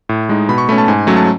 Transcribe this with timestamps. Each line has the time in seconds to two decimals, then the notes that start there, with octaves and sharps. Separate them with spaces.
0.09 A2
0.29 G#3 D#4
0.49 B2 B5
0.58 C#6
0.69 A3 C#4 B5
0.78 A5
0.88 G#2 G#5
1.07 F#3 A3 C#4 G#5
1.17 A5